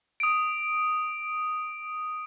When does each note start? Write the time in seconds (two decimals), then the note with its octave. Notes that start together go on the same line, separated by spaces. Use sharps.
0.20 D#6 D7